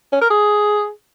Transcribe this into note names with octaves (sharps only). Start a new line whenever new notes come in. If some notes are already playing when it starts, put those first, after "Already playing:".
C#4
A#4
G#4